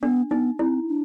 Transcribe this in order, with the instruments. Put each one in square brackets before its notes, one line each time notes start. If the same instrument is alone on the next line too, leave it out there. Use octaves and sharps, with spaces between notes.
[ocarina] B3 [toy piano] D4
[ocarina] B3 [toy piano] D#4
[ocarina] C4 [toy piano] E4
[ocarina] D4